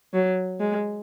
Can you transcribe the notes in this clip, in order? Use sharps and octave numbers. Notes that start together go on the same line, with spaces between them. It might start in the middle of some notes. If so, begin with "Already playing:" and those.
F#3
G#3